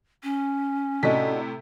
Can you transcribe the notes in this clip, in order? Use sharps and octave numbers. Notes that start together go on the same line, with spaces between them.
C#4
A2 C3 D4 F#4 D#5 B6